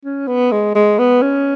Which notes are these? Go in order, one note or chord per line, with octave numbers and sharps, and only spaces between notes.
C#4
B3
G#3
G#3
B3
C#4